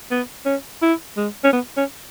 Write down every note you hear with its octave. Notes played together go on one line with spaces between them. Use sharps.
B3
C#4
E4
G#3
C#4
B3
C#4